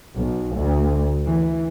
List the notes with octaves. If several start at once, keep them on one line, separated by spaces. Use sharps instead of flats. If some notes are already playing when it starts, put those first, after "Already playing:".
B1
D2
E3